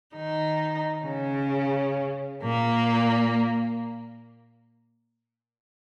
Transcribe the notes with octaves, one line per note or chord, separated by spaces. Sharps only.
D#3 D#4
C#3 C#4
A#2 A#3